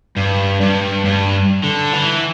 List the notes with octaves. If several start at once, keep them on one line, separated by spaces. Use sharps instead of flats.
G2
G2
G2
D3
E3